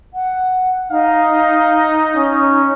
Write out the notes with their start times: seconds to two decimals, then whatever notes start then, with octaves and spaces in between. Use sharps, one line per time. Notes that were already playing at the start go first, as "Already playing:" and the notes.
0.14 F#5
0.91 D#4 F5
2.15 C#4